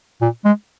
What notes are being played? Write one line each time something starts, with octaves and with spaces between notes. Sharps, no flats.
A#2
G#3